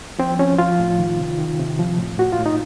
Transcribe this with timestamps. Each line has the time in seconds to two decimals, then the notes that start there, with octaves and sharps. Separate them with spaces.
0.19 F3 C4
0.39 F3 C#4
0.58 F3 F4
0.79 A2
0.99 D#3
1.19 C3
1.38 D#3
1.59 C3
1.79 F3
1.98 A2
2.18 A2 F#4
2.32 F4
2.39 A2
2.46 D#4